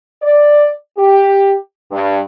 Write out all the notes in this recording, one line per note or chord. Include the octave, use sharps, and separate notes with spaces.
D5
G4
G2